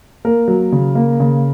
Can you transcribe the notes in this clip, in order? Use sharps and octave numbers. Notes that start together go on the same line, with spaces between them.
A#3 A#4
F#3
C#3
A#3
C#3